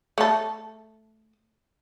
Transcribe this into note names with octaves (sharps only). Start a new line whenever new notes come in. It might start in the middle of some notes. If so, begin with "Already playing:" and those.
A3 A4